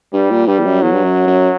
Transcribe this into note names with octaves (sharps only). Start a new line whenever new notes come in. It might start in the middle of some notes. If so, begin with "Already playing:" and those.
G2 G3
A#2
G2 G3
E2
F#2
E2 F#3
G2
F#2
F#2